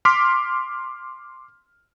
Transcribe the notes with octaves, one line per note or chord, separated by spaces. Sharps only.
C6 D6 F6 B6